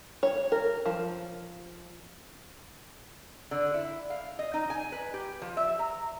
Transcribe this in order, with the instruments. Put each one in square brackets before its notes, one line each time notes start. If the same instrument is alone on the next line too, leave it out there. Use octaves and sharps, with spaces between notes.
[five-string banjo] C#5
A#4
F3
[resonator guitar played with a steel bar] D3
E4
F5
D#5
D#4
G#5
B4
G4
F3
E5
A#5